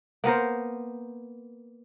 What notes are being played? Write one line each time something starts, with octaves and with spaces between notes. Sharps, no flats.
A#3 B3 A#4 C5